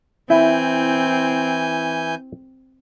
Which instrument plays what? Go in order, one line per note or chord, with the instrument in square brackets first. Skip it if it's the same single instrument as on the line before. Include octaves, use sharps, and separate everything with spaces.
[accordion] E3 G#5 G6 [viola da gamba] C4 [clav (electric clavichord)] E4